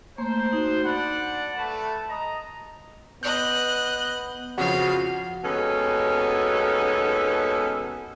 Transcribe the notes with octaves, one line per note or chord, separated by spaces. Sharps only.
A3 A#3 C5
D#4 F#4
D4 D5 F#5 B5
A3 B4 A5
D#5 A#5
B3 D#5 F#6 G6
F2 C#3 F3 F#4 F5
D#2 B2 G#3 B3 C#4 A4